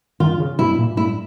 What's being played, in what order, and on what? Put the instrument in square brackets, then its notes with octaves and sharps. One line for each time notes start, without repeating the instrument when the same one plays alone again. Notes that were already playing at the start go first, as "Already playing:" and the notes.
[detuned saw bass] D#3 [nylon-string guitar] F4
[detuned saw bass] C#3
[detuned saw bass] B2 [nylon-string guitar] E4
[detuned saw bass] A#2
[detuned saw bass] A2 [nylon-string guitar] E4